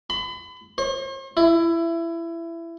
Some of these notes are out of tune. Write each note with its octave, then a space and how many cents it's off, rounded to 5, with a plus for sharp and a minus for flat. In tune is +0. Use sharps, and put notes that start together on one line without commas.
B5 +35
C5 +45
E4 +20